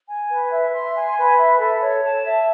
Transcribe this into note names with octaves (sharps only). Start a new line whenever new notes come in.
G#5
B4
E5
C6
G#5
B4
E5
A4
C#5
A5
E5